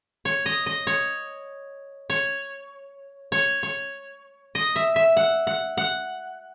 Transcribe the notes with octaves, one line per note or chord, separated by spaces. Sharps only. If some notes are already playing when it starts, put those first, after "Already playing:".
C#5
D#5
D#5
C#5
C#5
C#5
C#5
D#5
E5
E5
F#5
F#5
F#5